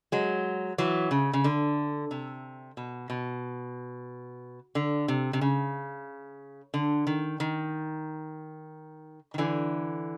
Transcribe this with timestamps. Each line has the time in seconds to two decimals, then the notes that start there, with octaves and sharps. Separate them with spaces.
0.12 F#3 G#3
0.78 E3 F#3
1.11 C#3
1.33 C#3
1.44 D3
2.11 C3
2.77 B2
3.10 B2
4.75 D3
5.08 C3
5.33 C3
5.41 C#3
6.74 D3
7.07 D#3
7.40 D#3
9.34 D#3
9.38 D3 E3